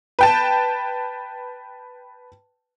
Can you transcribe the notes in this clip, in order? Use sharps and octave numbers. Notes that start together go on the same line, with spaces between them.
B4 G5 A5